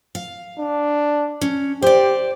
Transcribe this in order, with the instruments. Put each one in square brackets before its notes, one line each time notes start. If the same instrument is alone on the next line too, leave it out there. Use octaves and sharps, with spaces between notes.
[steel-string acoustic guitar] F5
[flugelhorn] D4
[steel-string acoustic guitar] C#4
[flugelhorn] G4 [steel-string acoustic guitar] C5 D5